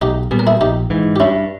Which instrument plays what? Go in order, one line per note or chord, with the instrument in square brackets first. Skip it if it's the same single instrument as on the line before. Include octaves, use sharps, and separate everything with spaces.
[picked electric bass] B1 [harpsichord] D#4 G4
[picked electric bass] A#2 G3 B3 [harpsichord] G#4
[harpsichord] A#4
E4 G#4
[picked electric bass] A#1 [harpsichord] D#4 G4
[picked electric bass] G#2 E3
[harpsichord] G4
[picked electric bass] G2 [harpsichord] C#4 E4